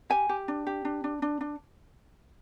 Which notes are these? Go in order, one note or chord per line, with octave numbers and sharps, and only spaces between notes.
G4 G#5
G4
D4
G4
D4
D4
D4
D4